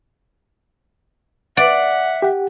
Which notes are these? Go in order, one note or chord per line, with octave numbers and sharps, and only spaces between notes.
D5 E5 F#5
G4 F#5